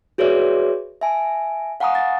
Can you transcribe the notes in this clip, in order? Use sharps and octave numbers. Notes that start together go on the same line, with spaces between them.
F#4 G#4 B4 C#5 D5 E5
E5 G#5 A5
F5 F#5 G#5 A#5 C#6 D#6
D#6 A6